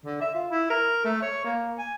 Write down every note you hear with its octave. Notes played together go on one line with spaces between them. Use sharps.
D3
E5
F4
E4
A#4
A3
C#5
A#3
G#5